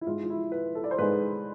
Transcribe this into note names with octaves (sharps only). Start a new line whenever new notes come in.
E4
G#2 G#3 F4
F4
E4
B4
A4
D5
C5
G#2 G#3 B4